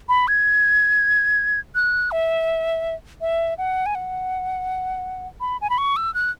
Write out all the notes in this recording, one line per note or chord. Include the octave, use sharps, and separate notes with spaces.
B5
G#6
F#6
E5
E5
F#5
G#5
F#5
B5
G#5
B5
C#6
E6
F#6